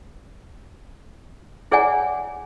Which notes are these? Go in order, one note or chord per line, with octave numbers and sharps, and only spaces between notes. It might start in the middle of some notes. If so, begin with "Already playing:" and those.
E4 G#4 C#5 D5 F#5 G#5